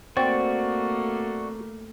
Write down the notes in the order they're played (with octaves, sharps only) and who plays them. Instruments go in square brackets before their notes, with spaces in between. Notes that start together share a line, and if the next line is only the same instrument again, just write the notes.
[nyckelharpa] A3 A#3 [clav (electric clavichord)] C4 [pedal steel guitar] F#4 D5 C#6